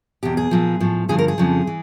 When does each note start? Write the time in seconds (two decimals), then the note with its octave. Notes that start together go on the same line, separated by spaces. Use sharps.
0.23 E2 B2 G4
0.37 G#4
0.51 A#2 F3
0.81 A2 F3
1.09 G2 D3 F3 G#4
1.19 A#4
1.28 G#4
1.38 F2 C#3 F3
1.67 E3